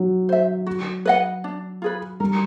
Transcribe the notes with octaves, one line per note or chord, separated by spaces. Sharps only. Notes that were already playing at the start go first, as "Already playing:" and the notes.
Already playing: F#3
C5 E5
F#4
B4 D#5 F#5
D4
F4 G#4 B4
G3 A#4